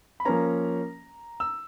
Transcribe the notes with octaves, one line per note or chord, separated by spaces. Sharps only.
B5
F3 A#3 C#4 A#5
E6